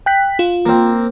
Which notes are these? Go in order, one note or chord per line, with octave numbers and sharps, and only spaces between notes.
G5 F#6 B6
F4
A#3 C4